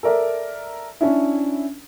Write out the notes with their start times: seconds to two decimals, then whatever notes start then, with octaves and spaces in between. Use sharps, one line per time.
0.03 A4 A#4 D5 E5
1.01 C#4 D4 E4